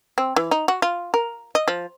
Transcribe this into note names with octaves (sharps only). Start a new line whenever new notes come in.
C4
E3
D#4
F#4
F4
A#4
D#5
F3